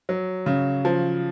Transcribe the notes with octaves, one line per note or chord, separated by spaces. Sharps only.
F#3
C#3
F3